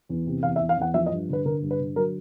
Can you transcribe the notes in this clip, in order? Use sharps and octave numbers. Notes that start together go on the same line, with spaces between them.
E2
C3
E2 F5
E5
E2
F5
E2 F#5
F3 E5
D#5
G2
D3 B4
D3 A#4
G2
B4
D3
F#3 A#4